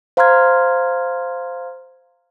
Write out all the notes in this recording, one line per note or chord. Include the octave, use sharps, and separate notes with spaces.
C5 F5 A#5 C6 F6 G#6